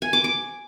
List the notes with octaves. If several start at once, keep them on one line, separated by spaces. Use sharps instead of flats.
G#5
D6
D6